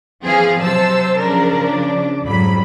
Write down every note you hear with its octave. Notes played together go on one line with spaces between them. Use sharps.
E3 F3 C4 G#4 F5
C3 F#3 C5 A5 E6
C#3 F3 D4 A#4
D5
F2 G#2 F#3 G3 B5